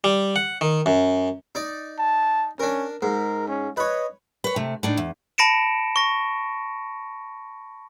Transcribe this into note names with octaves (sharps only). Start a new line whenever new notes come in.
G3
F#5
D#3
F#2
D#4 D5
A5
C#4 D4 A#4
G#2 A#4
C#4
B4 C#5 D#5
B4 C#5
C3 A3
A2 D4 D#4
E2
A5 B5 A#6 C#7 D7 E7
C#6 A#6